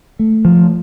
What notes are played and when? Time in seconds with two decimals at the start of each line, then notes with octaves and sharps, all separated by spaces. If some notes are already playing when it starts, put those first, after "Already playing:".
0.19 A3
0.45 F3